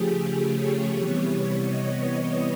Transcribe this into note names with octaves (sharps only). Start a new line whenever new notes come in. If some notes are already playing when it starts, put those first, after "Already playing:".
Already playing: C#3 F3 A3 G4 G#4
C#5
C3 E3 G3 B3
D#5